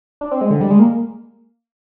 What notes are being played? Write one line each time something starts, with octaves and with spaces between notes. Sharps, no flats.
D4
C4
G#3
D3
G3
G#3
A#3